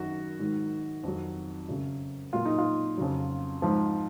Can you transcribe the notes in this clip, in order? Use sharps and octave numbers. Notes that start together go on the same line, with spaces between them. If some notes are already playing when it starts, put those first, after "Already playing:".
Already playing: F#2 D#3 F#3 F#4
G#2 D#3 F#3
F2 D#3 F#3
F#2 C#3 F#3
A#2 F#3 F4
D#4
F4
F2 C#3 F#3
G#2 F3